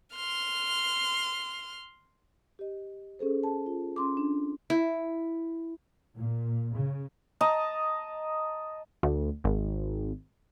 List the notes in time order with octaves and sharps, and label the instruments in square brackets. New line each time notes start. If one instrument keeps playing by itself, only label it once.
[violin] C6 F6
[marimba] G4 D#5
C#4 G#4 A4 C5
A5
F4
C#4 C6 D6
D4
[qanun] E4
[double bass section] A#2
C#3
[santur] D#5 A5 A#5
[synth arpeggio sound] D2
G#1